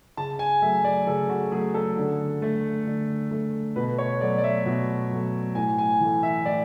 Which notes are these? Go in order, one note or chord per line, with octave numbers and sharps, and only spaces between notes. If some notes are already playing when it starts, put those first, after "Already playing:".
C#3 A5
G#5
F#3 A3 E5
D5
C#3 A4
F#4
F#3 A3 G#4
A4
D3
A3
D3
A3
B2 B4
C#5
F#3 A3 D5
D5
E5
B2
F#3 A3
A2 G#5
G#5
E3 A3
E5
A2 D5